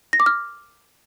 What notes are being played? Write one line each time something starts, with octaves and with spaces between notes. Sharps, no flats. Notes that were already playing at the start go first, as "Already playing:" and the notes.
A#6
D6
F6